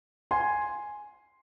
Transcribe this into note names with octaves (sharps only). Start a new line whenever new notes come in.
G#5 C6